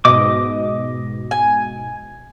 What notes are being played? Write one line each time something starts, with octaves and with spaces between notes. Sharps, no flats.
G#2 B2 D#5 D6
G#5